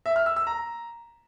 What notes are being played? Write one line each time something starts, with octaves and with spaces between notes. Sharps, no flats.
E5
F6
E6
E6
A#5